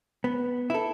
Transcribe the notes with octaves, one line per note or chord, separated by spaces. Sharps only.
B3
E4 A4